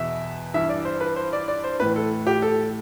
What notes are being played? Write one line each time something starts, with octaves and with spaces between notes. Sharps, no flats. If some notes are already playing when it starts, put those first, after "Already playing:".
Already playing: E2 B2 E5
G2 E3 E5
D5
C5
B4
C5
D5
D5
C5
A2 E3 B4
A4
G4
A4